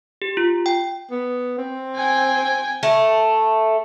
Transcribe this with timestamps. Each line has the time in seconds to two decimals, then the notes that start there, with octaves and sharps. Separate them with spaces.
0.22 G4
0.37 F4
0.66 G5
1.11 B3
1.58 C4
1.95 G5 G#5
2.83 A3